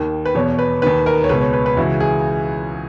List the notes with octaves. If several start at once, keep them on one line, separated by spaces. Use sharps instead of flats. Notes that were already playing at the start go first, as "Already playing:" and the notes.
Already playing: D#2 D#3
B4
E2 B2 C#5
B4
D#2 D#3 B4
A#4
C#5
C#2 B2 B4
C#5
B4
B4
C#2 C#3 E3 F#4
G#4